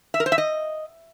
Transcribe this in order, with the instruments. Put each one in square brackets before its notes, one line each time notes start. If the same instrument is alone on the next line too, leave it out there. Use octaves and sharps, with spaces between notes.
[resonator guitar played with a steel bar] E5
A#4
C5
E5
D#5